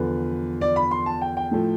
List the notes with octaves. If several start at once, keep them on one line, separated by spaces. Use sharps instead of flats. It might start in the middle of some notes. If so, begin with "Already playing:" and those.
Already playing: E2 D3 F3 B4
D5
B5
C6
A5
G5
G5
A2 F3 A3